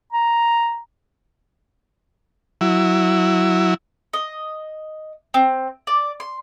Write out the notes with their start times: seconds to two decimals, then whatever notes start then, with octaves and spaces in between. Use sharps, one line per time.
0.13 A#5
2.61 F#3 E4
4.13 D#5
5.34 C4
5.87 D5
6.20 C6